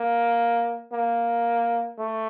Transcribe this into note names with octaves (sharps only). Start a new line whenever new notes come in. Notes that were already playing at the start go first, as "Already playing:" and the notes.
Already playing: A#3
A#3
A3